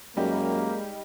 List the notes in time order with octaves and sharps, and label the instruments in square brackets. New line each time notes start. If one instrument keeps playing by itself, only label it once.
[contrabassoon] F#2 [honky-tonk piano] G3 D#4 G4 [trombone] G#3 [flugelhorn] A#3